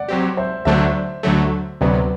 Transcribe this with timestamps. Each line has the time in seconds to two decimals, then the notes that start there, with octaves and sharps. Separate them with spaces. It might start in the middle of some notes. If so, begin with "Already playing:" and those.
Already playing: D5 F#5
0.08 F#3 C4 G4
0.37 C5 E5
0.65 D2 D3 F#3 A3 D4 C5 E5
1.23 D2 D3 F#3 A3
1.81 D2 C3 F#3 B3 B4 D5